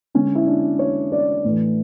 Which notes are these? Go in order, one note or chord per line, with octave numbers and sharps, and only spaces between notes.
D3 G#3 C#4
E4
D4
C#5
D5
A2 E3 A3